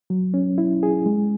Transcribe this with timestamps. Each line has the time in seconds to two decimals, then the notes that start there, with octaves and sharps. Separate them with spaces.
0.10 F#3
0.34 C#4
0.58 E4
0.83 G#4
1.06 G#3